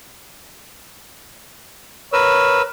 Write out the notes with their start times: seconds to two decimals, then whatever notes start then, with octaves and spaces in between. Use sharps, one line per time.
2.13 A#4 B4 C#5 E6